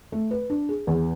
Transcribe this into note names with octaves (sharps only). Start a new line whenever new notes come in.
A3
B4
D4
G#4
E2